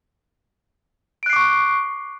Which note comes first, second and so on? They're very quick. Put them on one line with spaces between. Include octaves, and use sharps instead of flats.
D7 F#6 C7 D6 C#6